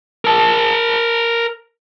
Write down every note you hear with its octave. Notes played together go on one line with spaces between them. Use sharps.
A#4 A5